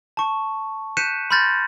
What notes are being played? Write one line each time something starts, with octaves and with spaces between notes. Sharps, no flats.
A5 C#6
F#6 G6 B6 C#7 D#7 E7
B5 C6 F6 G6 A6 A#6